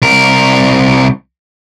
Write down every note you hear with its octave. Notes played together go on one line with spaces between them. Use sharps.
C2 A#4